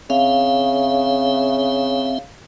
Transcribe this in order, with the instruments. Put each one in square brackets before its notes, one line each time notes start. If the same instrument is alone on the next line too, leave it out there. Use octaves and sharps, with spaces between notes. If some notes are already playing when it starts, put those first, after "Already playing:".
[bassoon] C#3 [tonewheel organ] C4 E5 [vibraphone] F5